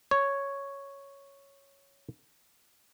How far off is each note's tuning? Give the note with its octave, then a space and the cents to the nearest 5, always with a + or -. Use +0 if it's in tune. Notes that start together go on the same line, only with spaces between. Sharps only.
C#5 +0